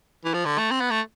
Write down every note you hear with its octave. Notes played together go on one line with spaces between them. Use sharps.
E3
F3
D3
A3
C4
B3
A3